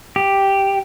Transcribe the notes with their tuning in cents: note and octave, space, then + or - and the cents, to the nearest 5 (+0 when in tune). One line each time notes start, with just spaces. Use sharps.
G4 +0